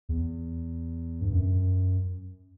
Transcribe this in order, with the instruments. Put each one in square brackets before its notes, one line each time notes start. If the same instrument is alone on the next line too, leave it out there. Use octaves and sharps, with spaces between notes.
[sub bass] E2
G2
F#2